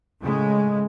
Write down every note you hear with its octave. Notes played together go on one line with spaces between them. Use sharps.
A2 C#3 G#3